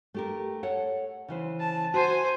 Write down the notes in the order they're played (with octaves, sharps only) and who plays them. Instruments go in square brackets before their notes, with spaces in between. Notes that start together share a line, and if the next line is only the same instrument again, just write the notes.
[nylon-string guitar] A3 G4 A#4
A4 C#5 F#5
C#3 E3 C5
[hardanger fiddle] A5
[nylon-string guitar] F#4 [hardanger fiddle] C5 G#5